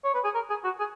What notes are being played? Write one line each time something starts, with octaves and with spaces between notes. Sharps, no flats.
C#5
B4
G#4
A#4
G#4
F#4
G#4